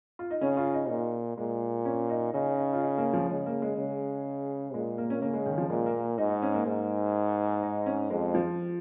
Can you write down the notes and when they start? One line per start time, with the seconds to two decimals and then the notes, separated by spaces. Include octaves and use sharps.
0.19 F4
0.30 D#4
0.41 C#3 C#4
0.57 F4
0.73 D#4
0.89 A#2 D#4
1.38 A#2 G#3
1.85 C#4
2.10 D#4
2.34 C#3 D#4
2.57 D#4
2.73 F4
2.81 D#4
2.98 A#3
3.13 F3
3.30 C#3 G#3
3.46 A#3
3.62 G#3
3.77 C#3
4.74 A#2 G#3
4.98 A#3
5.10 C#4
5.22 C#3 A#3
5.34 G#3
5.46 D#3
5.58 F3
5.69 A#2 G#3
5.86 A#3
6.18 G#2 D#4
6.30 D#4
6.42 C#4
6.54 A#3
6.67 G#2
7.62 D#4
7.86 C#4
8.10 F2 G#3
8.35 F3